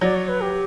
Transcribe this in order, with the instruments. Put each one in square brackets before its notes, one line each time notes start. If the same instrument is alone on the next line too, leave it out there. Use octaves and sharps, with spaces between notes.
[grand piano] F#3 [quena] D5
[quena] C#5
B4
G4